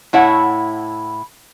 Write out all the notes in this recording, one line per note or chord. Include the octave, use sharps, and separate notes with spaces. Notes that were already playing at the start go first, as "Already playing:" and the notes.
A2 E4 C#5 F#5